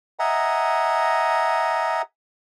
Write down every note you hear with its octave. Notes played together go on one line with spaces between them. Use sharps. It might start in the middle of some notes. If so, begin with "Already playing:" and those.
D#5 E5 F#5 G#5 A#5